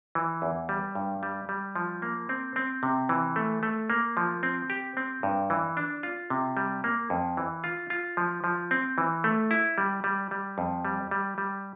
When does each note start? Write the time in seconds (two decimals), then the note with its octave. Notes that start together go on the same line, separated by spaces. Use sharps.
0.15 E3
0.42 E2
0.69 G3
0.95 G2
1.23 G3
1.49 G3
1.76 F3
2.02 A#3
2.29 C4
2.56 C4
2.83 C3
3.09 E3
3.36 A3
3.63 A3
3.90 A#3
4.17 F3
4.43 C4
4.70 G4
4.97 C4
5.23 G2
5.50 E3
5.77 D4
6.03 F4
6.30 C3
6.57 G3
6.84 A#3
7.10 F2
7.37 E3
7.64 F4
7.90 F4
8.17 F3
8.44 F3
8.71 C4
8.98 E3
9.24 A3
9.51 E4
9.78 G3
10.04 G3
10.31 G3
10.58 F2
10.85 G3
11.11 G3
11.38 G3